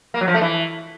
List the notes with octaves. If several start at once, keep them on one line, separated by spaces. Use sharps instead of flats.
A#3
F#3
F3
A3
E3